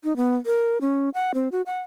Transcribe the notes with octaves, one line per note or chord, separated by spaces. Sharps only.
D#4
B3
A#4
C#4
F#5
C4
F#4
F#5